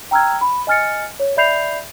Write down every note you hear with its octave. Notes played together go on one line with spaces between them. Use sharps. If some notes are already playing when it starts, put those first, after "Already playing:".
G5 A#5 E6 F6 G#6
B5
D#5 G#5 F6 A6 C#7
C#5
D5 E5 B5 G6 C7 F7